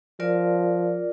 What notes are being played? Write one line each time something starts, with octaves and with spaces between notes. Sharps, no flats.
F3 F4 A#4 D5